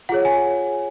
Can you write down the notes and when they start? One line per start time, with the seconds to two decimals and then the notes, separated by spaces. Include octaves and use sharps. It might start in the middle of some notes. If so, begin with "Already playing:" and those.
0.09 F4 G#4 C#5 F#5
0.25 G#5